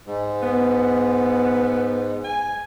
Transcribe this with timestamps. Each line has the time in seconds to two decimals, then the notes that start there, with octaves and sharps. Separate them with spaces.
0.06 G#2
0.42 B3
2.24 G#5